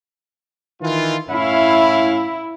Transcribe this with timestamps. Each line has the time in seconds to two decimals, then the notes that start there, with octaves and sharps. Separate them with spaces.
0.81 D#3 E3 F4
1.30 A2 C#4 E4 F5